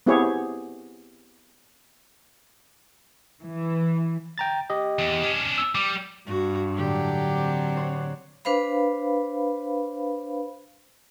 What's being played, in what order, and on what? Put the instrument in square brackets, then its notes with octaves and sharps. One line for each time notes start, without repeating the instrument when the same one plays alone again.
[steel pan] B3 C4 E4 G4 G#4 C#5
[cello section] E3
[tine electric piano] G5 A#5 A6
G4 D#5
[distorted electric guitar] E2
C#4 D4
[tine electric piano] E6
[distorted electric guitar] G3 [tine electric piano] D6
[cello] G2 [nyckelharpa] F#4
[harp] A2 D3 A3 [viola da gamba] F#3 D5 [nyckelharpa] G4
[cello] C4
[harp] C5 C#5 F#5
[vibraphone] D4 B4 C5 F5 B5